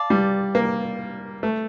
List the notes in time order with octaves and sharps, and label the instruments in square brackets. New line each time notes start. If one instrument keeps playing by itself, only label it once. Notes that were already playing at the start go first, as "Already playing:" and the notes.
Already playing: [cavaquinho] D5 F5 A5
[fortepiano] G3
A#3
A3